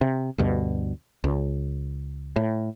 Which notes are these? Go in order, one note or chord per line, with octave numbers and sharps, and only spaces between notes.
C3
D2 G2 B2
C#2
A2